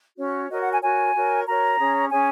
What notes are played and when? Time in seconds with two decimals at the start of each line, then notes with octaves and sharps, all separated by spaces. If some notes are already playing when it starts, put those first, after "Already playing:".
0.17 C#4 F#4 C#5
0.50 F#4 A#4 C#5 D#5
0.61 F#5
0.71 G#5
0.81 F#4 A#4 C#5 G#5
1.14 F#4 A#4 C#5
1.46 F#4 A#4 C#5 A#5
1.78 C#4 G#4 C#5
2.10 C#4 G#4 C#5 G#5